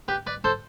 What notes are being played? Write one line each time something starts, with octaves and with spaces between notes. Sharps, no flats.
G4 B4
B4 D5
A4 C5